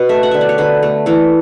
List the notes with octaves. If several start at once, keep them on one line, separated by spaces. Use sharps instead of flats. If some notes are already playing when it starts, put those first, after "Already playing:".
Already playing: B2 B3
A3 E5
F#5
D3 E5
D5
C#5
D3 B4
A3
E3 A4